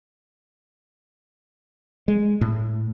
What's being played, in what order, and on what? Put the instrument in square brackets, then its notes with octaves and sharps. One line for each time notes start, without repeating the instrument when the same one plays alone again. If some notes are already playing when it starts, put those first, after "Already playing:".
[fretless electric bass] G#3
A2